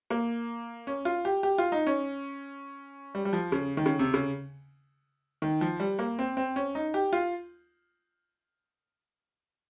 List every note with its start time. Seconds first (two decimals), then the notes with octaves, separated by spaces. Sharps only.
0.10 A#3
0.87 C#4
1.05 F4
1.25 G4
1.43 G4
1.58 F4
1.72 D#4
1.87 C#4
3.15 G3
3.25 G3
3.33 F3
3.52 C#3
3.77 D#3
3.86 C#3
3.99 C3
4.14 C#3
5.42 D#3
5.61 F3
5.80 G3
5.99 A#3
6.19 C4
6.37 C4
6.56 C#4
6.75 D#4
6.94 G4
7.13 F4